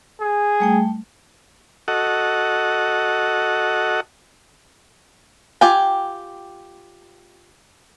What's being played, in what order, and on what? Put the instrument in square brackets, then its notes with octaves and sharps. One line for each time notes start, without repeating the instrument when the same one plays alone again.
[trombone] G#4
[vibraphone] G3 A3 G5
[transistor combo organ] F#4 A4 D#5 F#5
[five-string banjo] F4 G4 G5 G#5